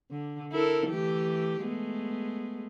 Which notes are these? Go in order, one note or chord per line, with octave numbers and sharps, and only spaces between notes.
D3
E4 A4 A#4
E3 A3 G4
G#3 A3 B3